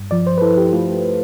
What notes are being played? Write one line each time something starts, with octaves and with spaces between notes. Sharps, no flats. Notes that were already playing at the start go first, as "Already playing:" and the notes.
Already playing: G2
F3 D5
C5
B4
E4 A4
G4
A3 F4